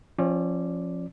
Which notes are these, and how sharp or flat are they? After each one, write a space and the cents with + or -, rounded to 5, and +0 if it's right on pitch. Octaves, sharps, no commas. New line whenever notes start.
F3 +0 C#4 -30 D5 +0